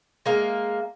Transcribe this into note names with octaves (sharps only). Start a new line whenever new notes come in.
G#3 A#3 F5